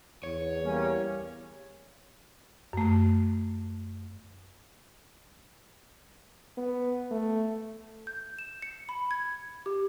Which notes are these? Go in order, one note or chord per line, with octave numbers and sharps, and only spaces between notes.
E2 C#5
G3 A#3 C#4
F#2 A3
B3
A3
G6
E7
C#7
B5
G#6
G4